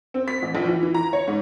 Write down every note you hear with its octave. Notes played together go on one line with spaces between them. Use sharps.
C4
B6
A1
A#1
E3
E3
A#5
C#5
G#2